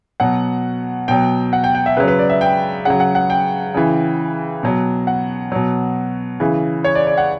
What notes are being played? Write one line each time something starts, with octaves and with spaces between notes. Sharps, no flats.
B2 F#3 F#5
B2 F#3 G5
F#5
G5
G5
E5
C#3 F#3 B4
B4
D5
E5
G5
C#3 F#3 F#5
F#5
F#5
G5
C#3 E3
B2 F#3
F#5
B2 F#3
C#3 E3
C#5
D5
D5
F#5